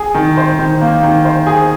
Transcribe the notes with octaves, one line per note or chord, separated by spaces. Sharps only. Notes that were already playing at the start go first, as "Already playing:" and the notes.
Already playing: G#4
D#3
C5
D#3
A#3
D#3
C5
G#4